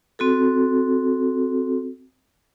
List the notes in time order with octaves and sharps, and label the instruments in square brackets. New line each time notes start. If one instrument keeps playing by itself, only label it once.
[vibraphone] C4 F#4 A4